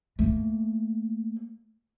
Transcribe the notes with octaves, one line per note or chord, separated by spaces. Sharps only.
A3 A#3